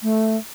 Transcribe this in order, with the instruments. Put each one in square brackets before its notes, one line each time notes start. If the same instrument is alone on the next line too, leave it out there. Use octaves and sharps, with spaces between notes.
[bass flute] A3